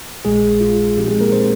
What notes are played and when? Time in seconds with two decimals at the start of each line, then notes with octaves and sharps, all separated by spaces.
0.25 A#1 A#2 G#3 G#4
0.60 F4
0.97 A#2 F3 C4 D#4 G4
1.08 G#3 G#4
1.21 A#3 A#4
1.32 C4 C5